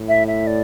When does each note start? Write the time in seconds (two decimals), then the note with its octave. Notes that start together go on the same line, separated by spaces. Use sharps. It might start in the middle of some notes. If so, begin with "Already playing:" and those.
Already playing: A2
0.09 E5
0.27 E5
0.47 D5